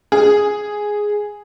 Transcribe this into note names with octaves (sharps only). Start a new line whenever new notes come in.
G#4